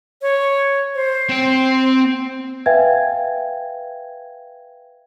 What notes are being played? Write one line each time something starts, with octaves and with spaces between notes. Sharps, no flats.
C#5
C5
C4 G5
B4 E5 F5 G5 G#5 G#6